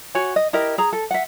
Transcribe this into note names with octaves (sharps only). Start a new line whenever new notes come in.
F#4 C#5 G#5
D#5
E4 G4 A#4 D#5
G#4 A#5
A4
E5 F#5